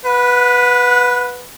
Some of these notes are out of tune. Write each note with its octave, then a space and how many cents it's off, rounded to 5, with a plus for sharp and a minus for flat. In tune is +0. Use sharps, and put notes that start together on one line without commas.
B4 +0 F#5 -30